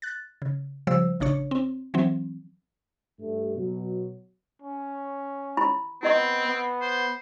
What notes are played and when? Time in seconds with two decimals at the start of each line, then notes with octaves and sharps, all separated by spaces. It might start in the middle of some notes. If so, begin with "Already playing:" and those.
0.02 F#6 A6
0.42 C#3
0.87 C#3 F3 G3 C5 E6
1.20 A1 C#3 D4 C#5
1.51 C4
1.94 E3 F#3 C4
3.20 G2 G3 A3
3.55 B2 F#3
4.62 C#4
5.57 E4 B5 C6
6.03 B3 C4 E4 D#5 C6
6.47 B3
6.82 C5